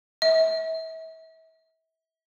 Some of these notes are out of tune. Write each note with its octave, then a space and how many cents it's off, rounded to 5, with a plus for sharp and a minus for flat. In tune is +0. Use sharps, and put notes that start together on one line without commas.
E5 -35